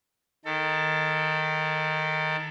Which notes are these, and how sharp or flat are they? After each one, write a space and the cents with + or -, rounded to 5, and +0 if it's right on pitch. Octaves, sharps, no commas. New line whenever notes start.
D#3 +0 A4 +20